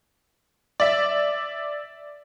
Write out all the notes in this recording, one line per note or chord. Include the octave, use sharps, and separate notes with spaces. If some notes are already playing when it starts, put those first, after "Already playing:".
D5 E5